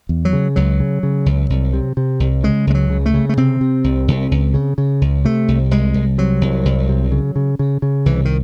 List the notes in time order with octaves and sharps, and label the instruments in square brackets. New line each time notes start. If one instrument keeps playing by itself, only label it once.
[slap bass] E2
F#3
C#3
C#2 F#3
C#3
C#3
C#2
C2
C3
C3
C2
C#3 G#3
C#2 G#3
F#3
C#3
A3
C#3
A3
C3 C4
C3
C2
C2
C#2
C#3
C#3
C#2
C3 A3
C2
C2 G#3
C2
C3 F#3
C2
C2
C3
C#3
C#3
C#3
C#3
C2 E3
D#3